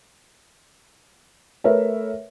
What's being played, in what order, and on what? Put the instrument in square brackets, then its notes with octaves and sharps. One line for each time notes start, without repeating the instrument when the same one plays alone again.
[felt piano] A3 A#4 B4 C#5 E5